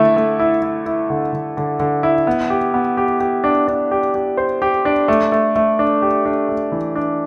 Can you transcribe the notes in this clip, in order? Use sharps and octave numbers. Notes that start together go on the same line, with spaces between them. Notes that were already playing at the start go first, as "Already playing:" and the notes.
Already playing: D3 A3 E4
A3
E4
E4
E4
D3
D3
D3
D3
E4
B3
G4
B3
G4
G4
D4
D4
G4
G4
C5
G4
D4
A3
A3
A3
D4
G4
D4
A3
E3
D4